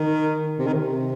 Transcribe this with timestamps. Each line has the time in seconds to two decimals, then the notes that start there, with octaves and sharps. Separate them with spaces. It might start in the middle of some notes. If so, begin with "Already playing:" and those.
Already playing: D#3
0.59 C3
0.67 D#3
0.74 C3